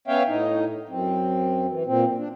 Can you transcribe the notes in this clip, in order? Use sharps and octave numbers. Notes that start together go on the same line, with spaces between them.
B3 C#4 C#5 E5 F5 G5
A2 D#4
F#2 C4
E3
A#2 C4
D4